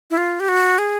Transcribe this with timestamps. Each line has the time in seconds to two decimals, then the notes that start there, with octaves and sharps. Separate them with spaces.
0.11 E4
0.17 F4
0.40 G4
0.48 F#4
0.78 G#4